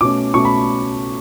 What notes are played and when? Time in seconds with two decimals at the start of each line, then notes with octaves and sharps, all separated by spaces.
0.01 B2 A3 C#4 D6
0.34 B2 A3 C#4 C#6
0.45 B5